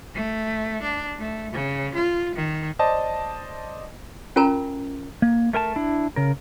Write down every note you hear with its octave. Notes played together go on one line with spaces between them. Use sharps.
A3
D4
A3
C#3
F4
D#3
C5 D5 D#5 A5
C#4 F4 A#4 G#5 A#5
A#3
A3 A#4 G#5 A5
D4 E4
C#3 A#4